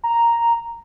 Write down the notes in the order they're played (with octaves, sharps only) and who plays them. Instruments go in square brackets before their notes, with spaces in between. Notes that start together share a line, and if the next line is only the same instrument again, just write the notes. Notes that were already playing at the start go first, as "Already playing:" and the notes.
[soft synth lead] A#5